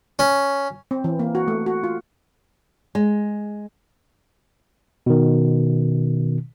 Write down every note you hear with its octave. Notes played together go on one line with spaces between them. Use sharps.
C#4
C4
E3
A#3
F#4
A3
F#4
F4
G#3
B2 D#3